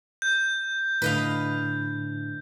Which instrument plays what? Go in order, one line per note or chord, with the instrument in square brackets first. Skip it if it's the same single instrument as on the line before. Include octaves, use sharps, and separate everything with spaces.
[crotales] G6
[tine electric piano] A2 D3 D4 [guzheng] B4 D#5 F5